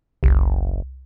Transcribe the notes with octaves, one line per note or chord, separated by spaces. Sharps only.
F#1 C2